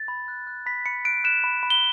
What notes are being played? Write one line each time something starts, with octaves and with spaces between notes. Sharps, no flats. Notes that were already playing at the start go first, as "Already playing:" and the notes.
Already playing: A6
B5
F#6
F#6
B5 B6
B5 C#7
F#6 D7
F#6 E7
B5
B5
G7